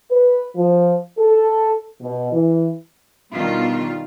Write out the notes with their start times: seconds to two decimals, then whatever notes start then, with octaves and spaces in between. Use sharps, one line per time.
0.11 B4
0.56 F3
1.19 A4
2.01 B2
2.32 E3
3.33 B2 D#3 G3 D4 F4